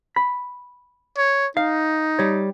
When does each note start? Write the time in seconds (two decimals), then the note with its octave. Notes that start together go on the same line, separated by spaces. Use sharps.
0.16 B5
1.17 C#5
1.57 D#4 F5
2.19 G3 C#5